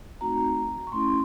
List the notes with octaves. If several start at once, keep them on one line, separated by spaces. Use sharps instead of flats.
A3 C4 D#4 F#4 A#5
C#6
A3 C#4 E4 C6